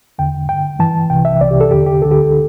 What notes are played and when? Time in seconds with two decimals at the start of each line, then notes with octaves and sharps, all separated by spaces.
0.19 E2 D3 G5
0.49 G2 D3 G5
0.79 G2 E3 A5
1.10 C2 C3 E3 G5
1.25 E5
1.40 C2 C3 E3 D5
1.51 G4
1.61 A4
1.71 E2 D3 G4
1.86 G4
2.02 D2 D3 A4
2.11 G4